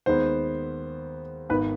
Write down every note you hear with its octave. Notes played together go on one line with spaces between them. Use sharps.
D#2 D#3 G#3 B3 C5
G#1 G#2 D#3 B3 B4